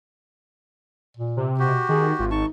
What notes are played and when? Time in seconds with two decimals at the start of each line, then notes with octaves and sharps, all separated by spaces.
1.17 A#2
1.37 C3
1.59 B2 F#4 G4
1.89 D#3 G#4
2.19 G#1 F4
2.31 D#4 A5 C#6